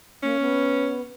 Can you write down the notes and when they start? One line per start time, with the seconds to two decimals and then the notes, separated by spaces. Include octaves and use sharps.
0.23 A#3 C#4
0.40 B3